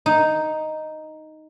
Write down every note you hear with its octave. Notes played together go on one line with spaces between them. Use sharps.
D#4